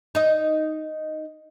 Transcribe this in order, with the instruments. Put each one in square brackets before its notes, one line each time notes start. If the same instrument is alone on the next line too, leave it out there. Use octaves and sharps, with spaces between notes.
[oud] D#4 D#5